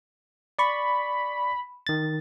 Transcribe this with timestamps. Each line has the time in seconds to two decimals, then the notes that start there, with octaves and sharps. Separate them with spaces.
0.59 D5 B5 C#6
1.87 D#3 A6